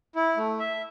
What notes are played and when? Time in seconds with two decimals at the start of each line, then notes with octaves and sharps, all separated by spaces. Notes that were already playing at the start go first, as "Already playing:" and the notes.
0.16 E4
0.37 A3
0.60 E5